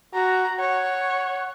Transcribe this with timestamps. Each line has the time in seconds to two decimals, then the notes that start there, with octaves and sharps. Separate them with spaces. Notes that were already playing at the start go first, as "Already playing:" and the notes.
0.14 F#4 A#5
0.59 C#5 F#5